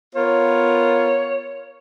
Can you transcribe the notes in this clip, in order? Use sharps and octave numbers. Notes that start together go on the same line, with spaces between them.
B3 F4 A#4 C#5